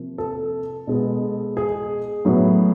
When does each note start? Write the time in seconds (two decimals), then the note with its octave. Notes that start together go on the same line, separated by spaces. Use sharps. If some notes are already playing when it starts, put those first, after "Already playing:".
Already playing: C3 F3 A#3
0.18 A4
0.87 B2 G#3 B3
1.57 G#4
2.25 A2 F#3 B3